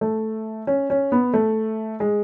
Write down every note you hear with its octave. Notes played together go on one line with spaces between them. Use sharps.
A3
C#4
C#4
B3
A3
G#3